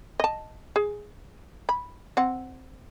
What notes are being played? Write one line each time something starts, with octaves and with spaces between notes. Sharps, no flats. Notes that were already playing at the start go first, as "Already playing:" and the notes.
D#5 A5
G#4
B5
C4 F#5